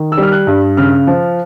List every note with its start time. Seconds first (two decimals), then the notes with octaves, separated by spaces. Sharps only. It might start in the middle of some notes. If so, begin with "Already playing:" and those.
Already playing: D#3
0.12 E6
0.17 G3
0.23 F6
0.32 F#6
0.47 G2
0.77 C#3 F6
1.07 F3